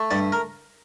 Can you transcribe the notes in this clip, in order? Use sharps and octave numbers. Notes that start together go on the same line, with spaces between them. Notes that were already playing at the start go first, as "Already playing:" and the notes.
Already playing: A3
G2 D5
A#4